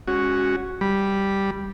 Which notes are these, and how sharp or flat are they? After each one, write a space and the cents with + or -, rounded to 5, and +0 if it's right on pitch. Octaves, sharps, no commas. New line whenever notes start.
G#3 -30 C#4 +0 F#4 +0
G3 +0 B5 -15